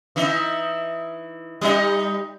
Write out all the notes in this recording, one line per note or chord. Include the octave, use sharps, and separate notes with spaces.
E3 D#4 E5
G3 D#4 D#5